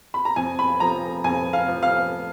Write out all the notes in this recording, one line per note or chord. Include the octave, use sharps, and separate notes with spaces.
B5
A#5
F2 G#5
B5
F3 A#5
F2 G#5
F5
F3
F5